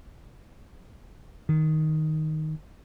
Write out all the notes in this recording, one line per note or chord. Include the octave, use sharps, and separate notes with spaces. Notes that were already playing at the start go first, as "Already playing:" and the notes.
D#3